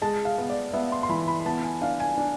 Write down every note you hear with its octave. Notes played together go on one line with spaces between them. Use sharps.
G#3 A5
F5
B3
D5
B3 E5
C6
C6
E3 B5
B5
B3 A5
G#5
D4 F5
G#5
D4